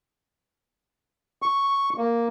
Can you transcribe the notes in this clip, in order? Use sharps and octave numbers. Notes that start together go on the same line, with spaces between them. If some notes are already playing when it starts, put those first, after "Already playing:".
C#6
A#3